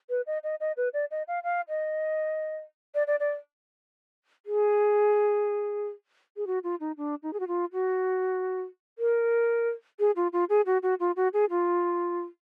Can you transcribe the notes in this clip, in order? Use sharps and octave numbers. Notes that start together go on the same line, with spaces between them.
B4
D#5
D#5
D#5
B4
D5
D#5
F5
F5
D#5
D5
D5
D5
G#4
G#4
F#4
F4
D#4
D4
D#4
G#4
F#4
F4
F#4
A#4
G#4
F4
F4
G#4
F#4
F#4
F4
F#4
G#4
F4